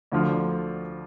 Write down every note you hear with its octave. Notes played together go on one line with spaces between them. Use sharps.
D2 D3 F3